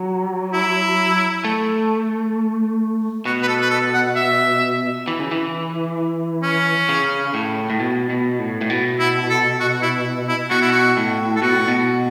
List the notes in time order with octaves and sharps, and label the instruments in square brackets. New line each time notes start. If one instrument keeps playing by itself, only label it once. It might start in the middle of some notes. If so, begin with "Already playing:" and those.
Already playing: [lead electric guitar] F#3
[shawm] E4
[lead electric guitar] A3
[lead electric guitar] B2 [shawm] F#4
[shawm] B4
A4
B4
A4
F#5
E5
[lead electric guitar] E3
C#3
E3
[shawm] C#4
[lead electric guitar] C#3
A2
A2
B2
B2
A2
A2
B2
[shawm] E4
A4
F#4
E4
E4
[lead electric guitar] B2 [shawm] F#4
[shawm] E4
F#4
[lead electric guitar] A2
[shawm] A4
[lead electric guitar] B2 [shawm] F#4
[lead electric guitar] A2
B2